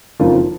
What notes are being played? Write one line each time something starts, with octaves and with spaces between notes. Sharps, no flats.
F#1 F2 D#3 A#3 F4